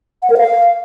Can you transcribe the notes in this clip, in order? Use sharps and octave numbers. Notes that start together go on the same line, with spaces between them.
F#5
A#4
F5